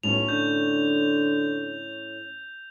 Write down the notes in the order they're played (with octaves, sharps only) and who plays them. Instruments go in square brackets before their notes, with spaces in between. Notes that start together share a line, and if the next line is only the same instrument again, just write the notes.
[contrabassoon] B1 [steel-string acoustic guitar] A2 C#4 C#5 [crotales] F7
[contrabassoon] D3 [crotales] G6